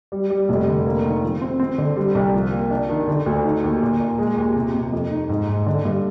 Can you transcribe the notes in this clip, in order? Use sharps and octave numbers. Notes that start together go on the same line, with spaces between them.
G3
G3
F1
D3
A#3
D#3
F3
C4
C4
D3
G3
C2
F3
A#3
D4
D#3
D3
D2
D#4
D#2
A#2
A#2
G#3
D#2
C3
C3
F2
D#4
G#2
G#2
D3
G2